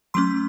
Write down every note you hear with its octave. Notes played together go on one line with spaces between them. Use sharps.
F#3 A3 C#4 C6